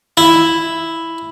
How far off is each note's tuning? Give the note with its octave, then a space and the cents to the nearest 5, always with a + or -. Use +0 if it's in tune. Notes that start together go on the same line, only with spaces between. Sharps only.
E4 +0